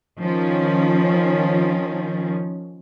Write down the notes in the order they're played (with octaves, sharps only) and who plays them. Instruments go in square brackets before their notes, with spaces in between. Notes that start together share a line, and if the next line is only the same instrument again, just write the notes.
[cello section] D#3 F3 C#4